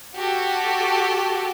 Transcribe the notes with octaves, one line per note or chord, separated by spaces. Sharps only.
F#4 G4 A4